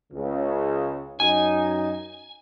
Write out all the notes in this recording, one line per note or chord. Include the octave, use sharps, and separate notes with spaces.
C#2 C#3
F#2 D#4 G#5